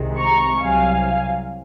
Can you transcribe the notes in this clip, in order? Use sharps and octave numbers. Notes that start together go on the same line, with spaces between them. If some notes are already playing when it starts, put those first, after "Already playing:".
Already playing: C2 C3 D#3 G#3
A#5 C#6
C2 C3 F#3 F5 G#5